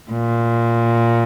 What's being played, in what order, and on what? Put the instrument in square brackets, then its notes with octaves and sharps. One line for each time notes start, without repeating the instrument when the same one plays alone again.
[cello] A#2